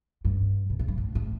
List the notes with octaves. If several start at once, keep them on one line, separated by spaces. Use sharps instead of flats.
G2
B2
A2
G2
A2
A2